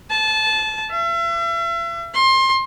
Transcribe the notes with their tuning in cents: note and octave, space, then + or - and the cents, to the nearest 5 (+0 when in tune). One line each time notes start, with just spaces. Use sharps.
A5 -20
E5 +40
C6 +25